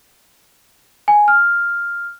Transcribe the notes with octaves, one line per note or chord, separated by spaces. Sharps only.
G#5
F6